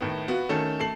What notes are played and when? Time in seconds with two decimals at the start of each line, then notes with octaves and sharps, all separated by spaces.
0.01 A2 D#3 B3
0.28 B3 F4 F#4
0.49 D#3 A3 C#4 A4
0.80 A3 A5 C7 F#7